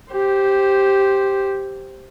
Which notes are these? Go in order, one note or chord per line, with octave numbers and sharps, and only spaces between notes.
G4 C5